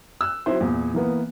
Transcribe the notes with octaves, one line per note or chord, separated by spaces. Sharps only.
E6 F#6
F#3 C4 E4 C5
E2 A#2
E3 A#3 B3